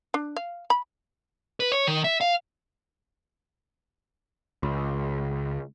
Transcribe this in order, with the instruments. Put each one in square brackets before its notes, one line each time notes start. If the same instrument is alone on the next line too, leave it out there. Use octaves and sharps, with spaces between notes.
[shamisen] D4
F5
B5
[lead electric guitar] B4
C#5
D#3
E5
F5
[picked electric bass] C#2